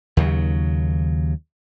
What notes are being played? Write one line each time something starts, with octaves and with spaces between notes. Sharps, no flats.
D#2 C#3 F#3